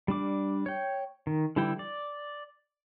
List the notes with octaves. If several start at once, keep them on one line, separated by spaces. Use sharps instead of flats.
G3 D4 D6
C#5 G5
D#3
D3 E3 G3 E4 G5
D5